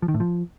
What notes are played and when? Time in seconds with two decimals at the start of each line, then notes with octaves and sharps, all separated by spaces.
0.02 F3
0.08 D#3
0.14 A2
0.20 F3